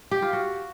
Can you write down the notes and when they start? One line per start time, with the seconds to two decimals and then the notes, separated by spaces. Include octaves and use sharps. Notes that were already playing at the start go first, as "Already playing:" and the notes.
0.11 G4
0.22 F4
0.33 F#4